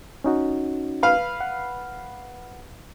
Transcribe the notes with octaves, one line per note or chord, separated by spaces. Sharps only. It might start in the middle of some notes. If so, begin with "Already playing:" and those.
C#4 D#4 F#4
B4 F5
F#5